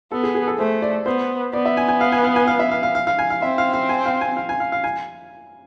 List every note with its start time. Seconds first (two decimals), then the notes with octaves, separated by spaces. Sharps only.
0.12 B3 A4
0.23 G#4
0.35 G#4
0.47 A4
0.58 A3 C5
0.82 D5
1.06 B3 C5
1.53 B3 D5
1.66 E5
1.77 G#5
1.88 G#5
2.01 F5
2.12 G#5
2.24 F5
2.36 G#5
2.47 F5
2.59 E5
2.71 F5
2.83 F5
2.95 F5
3.07 F5
3.19 G#5
3.30 F5
3.42 C4 E5
3.58 F5
3.74 F5
3.89 G#5
4.06 F5
4.21 G#5
4.37 F5
4.49 G#5
4.60 F5
4.72 F5
4.84 G#5